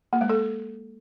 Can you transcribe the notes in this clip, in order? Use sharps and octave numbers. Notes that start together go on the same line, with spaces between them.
A#3
G#3
A4